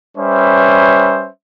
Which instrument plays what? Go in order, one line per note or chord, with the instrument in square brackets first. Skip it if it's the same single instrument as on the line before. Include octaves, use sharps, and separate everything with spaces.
[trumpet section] G3 C#4 B4 C5 E5